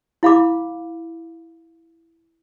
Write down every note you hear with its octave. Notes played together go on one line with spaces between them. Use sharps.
E4 F5 B5 D6